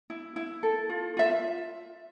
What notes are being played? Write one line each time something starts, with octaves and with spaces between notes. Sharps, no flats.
E4
E4
A4
F4
F4 E5